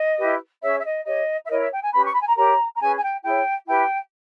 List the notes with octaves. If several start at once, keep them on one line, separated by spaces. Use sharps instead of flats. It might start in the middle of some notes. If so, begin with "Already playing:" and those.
Already playing: D#5
E4 G4 B4
C#4 G#4 C#5 E5
E5
D#5
G4 C#5 D#5
E5
E4 A#4 C#5 D#5
E5
G5
G#5
C#4 G4 B4 B5
C#6
B5
G#5
A#5
G4 A#4 C#5 A#5
A#5
C#4 G#4 B4 G#5
G#5
G5
E4 G#4 C#5 G5
E4 G4 B4 G5